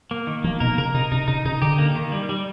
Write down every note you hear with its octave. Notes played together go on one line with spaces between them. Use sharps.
A#3
D#3
F3 A#3
B2 A#4
C#3 A#4
C3 D#4
C3 D#4
C#3 D#4
C#3 D#4
D3 G4
A#3
D#3
G3
G3